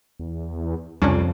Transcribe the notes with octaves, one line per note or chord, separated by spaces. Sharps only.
E2
C2 F2 C#3 C#4 D4